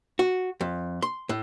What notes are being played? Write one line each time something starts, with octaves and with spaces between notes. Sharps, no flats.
F#4
F2
C6
A2